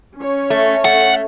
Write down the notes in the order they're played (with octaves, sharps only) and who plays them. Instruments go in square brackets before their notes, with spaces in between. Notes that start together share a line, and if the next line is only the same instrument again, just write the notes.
[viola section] C#4 C#5
[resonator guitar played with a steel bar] A3
[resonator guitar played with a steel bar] A3 [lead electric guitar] F#5